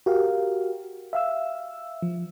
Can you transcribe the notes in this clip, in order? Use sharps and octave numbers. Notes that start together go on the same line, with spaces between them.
F#4 G4 A#4 F5
E5 F5 E6
F3